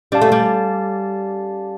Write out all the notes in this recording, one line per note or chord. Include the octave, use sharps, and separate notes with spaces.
G3 C#4 G4 D5 F5 A5
A3
G3